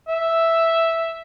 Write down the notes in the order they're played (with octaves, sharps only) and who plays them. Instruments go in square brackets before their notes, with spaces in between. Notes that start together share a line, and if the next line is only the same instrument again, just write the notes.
[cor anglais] E5